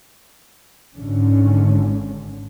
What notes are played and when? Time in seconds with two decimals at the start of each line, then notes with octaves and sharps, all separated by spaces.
0.95 G#1 G#2 D3 C#4